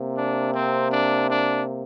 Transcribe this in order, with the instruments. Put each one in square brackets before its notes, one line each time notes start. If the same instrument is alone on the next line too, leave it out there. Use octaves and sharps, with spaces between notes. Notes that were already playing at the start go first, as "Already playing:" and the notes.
Already playing: [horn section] C3 A#3
D4
C4
D4
D4